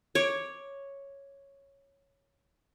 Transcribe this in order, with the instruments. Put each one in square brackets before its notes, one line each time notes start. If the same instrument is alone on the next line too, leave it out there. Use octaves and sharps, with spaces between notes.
[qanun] C#5 D6